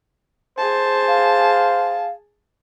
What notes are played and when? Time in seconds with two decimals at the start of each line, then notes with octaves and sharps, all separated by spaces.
0.58 G#4 C5 A5
1.08 F5